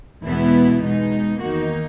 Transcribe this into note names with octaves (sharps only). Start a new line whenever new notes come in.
E2 B2 G#3 B3 E4
B2 G#3 D#4
E2 D#3 A#3 D#4 F#4